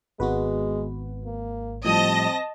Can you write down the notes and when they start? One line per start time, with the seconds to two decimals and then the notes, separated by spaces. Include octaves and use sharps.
0.20 G#1 G#3 B3 F#4 B4
1.25 A#3
1.85 A2 F3 G3 C4 D#5 A5 A#6